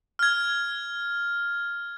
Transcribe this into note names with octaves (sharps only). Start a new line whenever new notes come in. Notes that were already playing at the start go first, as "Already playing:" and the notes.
F6 G#6